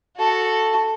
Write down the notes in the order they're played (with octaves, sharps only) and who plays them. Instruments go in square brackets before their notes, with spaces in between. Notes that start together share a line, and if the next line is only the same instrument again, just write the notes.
[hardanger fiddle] F#4 A4